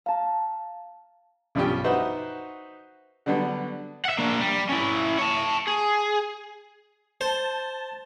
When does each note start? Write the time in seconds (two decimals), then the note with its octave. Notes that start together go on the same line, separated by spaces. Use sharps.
0.06 F5 A5 A#5
1.55 B1 G2 F3 C#4 G4
1.84 D#4 F#4 B4 C5 E5
3.26 D3 F#3 G3 B3 D4
4.05 E5 F#5
4.18 A#3 D4
4.39 G3
4.69 C#4 E4
5.18 C#5 A5
5.67 G#4
7.21 C5 A5